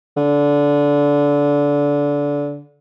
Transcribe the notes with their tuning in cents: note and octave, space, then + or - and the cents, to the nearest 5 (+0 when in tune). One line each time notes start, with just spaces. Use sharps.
D3 -20